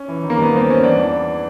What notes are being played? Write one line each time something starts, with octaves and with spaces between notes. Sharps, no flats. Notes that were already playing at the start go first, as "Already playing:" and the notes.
Already playing: C#4
E3
D#3
A#3
G2 B3
G2 C4
G2 C#4
E2 D4
E3